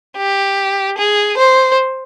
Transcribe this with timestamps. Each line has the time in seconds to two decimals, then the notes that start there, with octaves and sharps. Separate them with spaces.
0.17 G4
0.98 G#4
1.37 C5